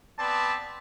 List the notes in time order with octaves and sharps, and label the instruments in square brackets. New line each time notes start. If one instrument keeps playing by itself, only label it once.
[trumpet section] B3 C4 D5 A5 B5